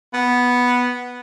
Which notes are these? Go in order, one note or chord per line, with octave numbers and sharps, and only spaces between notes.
B3